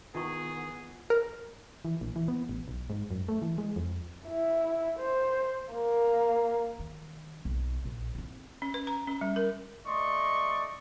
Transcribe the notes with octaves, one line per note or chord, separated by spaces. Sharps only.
D#3 B3 E4 F4 G#4 C#6
A#4
E3
A#1
E3
B3
A1
B1
G#2
F#2
A3
E3
G#3
F2
E4
C5
A#3
D#3
B1 D#4
A#1
C4 E4
C#4
B4
A#5
C#4
G3
A#4
A3 D5 D#5 C6 C#6